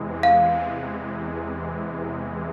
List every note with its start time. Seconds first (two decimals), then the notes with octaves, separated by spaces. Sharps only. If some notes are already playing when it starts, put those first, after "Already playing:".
Already playing: E2 C3 E3 G#3
0.23 F5